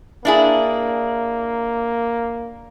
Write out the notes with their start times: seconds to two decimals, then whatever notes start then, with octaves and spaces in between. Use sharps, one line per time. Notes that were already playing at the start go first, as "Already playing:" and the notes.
0.25 A#3 D4 E4 G#4